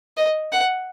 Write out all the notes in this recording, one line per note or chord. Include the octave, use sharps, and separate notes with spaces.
D#5
F#5